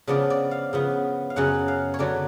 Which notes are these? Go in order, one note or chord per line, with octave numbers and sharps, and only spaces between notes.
C#3 F3 B3 D4 D5
D5
F5
C#3 F3 B3
F5
F#2 C#3 F#3 C#4 F#5
F5
C#5
D3 F#3 B3 D4 D5